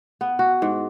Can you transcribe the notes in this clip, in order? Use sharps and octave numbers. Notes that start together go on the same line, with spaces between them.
B3
F#4
G#2